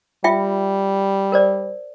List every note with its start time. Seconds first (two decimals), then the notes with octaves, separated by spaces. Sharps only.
0.24 G3 F4 E5 G5
1.32 A#4 C5 D5